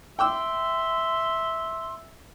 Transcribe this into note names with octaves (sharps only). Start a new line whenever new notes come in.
E5 G5 C6 D6 E6